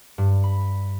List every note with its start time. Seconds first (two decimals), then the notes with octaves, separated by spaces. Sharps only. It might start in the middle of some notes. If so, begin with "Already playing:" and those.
0.18 G2
0.44 B5